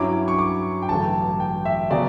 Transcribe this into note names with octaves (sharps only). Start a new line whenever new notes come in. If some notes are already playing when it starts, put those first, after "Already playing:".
Already playing: G2 F#3 C#4 E4 D6
C#6
D6
G5
A1 G2 D3 F#3 A5
G5
E5
C#3 F#3 B3 D5